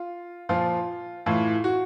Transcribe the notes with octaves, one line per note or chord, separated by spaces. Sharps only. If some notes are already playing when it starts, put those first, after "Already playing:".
Already playing: F4
A#2 F3 F4
A2 E3 F4
F#4